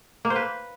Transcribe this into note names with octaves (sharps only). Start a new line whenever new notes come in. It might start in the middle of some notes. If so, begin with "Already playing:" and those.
A#3
C5
B4